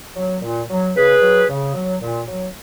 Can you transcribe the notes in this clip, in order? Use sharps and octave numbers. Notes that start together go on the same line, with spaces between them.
F#3
A#2
F#3
C#3 G#4 B4
F#3
C#3
F#3
A#2
F#3